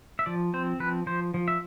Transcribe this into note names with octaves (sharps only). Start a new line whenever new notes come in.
E5
F3 D5
C4 C5
F3 B4
F3 C5
F3
E5